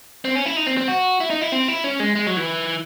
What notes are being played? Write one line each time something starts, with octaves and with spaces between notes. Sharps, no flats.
C4
C#4
E4
D#4
C4
C4
F#4
E4
D#4
E4
C4
E4
C#4
G#3
G#3
F#3
E3